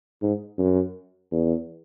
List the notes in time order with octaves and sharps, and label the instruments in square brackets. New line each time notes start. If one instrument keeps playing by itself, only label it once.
[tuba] G#2
F#2
E2